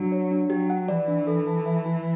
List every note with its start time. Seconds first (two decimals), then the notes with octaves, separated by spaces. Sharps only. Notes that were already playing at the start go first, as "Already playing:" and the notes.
Already playing: F#3 D4
0.12 C#5
0.31 D4
0.50 F#3 G4
0.70 F#5
0.88 E3 D5
1.08 D4
1.27 A4
1.47 A5
1.66 E5
1.86 E4